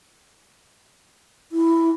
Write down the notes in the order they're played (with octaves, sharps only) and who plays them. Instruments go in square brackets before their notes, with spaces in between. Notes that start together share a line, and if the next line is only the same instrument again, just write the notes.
[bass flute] E4